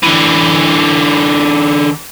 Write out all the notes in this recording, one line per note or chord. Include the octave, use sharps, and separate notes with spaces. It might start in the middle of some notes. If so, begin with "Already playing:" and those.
D3 E3